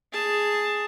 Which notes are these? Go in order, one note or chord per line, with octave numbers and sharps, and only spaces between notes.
G#4 A5